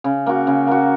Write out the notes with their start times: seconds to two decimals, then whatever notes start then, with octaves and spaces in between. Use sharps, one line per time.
0.04 C#3
0.26 A#3 F#4
0.47 C#3
0.67 A#3 F#4